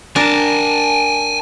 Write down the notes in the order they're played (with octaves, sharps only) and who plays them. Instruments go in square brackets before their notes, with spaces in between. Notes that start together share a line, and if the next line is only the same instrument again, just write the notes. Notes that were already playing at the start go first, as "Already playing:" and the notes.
[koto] D4 A#4 [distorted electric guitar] G#5 A5